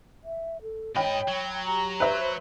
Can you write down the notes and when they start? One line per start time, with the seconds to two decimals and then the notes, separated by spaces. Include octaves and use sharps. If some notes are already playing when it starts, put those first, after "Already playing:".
0.24 E5
0.62 A4
0.96 G#2 C#5 D#5 G5 B5
1.28 F#3
1.66 G4 A#5
2.00 B4 C5 E5